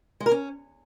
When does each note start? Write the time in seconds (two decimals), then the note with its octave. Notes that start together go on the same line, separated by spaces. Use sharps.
0.20 G#3
0.26 A#4
0.31 C#4